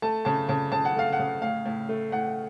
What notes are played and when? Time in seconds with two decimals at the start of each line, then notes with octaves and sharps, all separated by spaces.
0.02 A3 A5
0.25 C#3 A5
0.49 C#3 A5
0.72 C#3 A5
0.85 F#5
0.96 A3 F5
1.13 F#5
1.19 C#3
1.42 A2 F5
1.65 A2
1.89 A3
2.12 A2 F#5